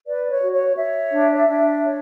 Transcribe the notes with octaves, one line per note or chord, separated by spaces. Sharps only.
B4 D5
C#5
F#4
C#5
C#5 E5
D4
D4
C#5